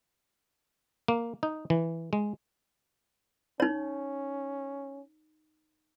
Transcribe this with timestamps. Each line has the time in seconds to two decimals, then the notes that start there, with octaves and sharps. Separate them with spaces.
1.08 A#3
1.43 D#4
1.70 E3
2.13 G#3
3.60 C#4 D#4 C#5